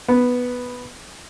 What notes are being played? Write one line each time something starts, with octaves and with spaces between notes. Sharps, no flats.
B3